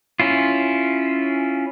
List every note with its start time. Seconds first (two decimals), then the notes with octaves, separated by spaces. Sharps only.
0.20 C#4 E4 F4